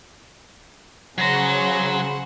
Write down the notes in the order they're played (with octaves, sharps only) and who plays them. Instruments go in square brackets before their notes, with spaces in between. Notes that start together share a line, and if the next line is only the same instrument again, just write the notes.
[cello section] C#3 [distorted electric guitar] F#3 A#5 [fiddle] C5 F#5